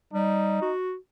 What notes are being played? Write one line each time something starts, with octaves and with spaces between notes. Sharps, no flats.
G3 D#4
F#4